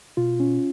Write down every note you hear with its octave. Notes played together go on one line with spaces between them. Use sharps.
B2 F4
C#4